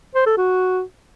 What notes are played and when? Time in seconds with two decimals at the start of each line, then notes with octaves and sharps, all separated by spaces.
0.15 C5
0.26 A4
0.38 F#4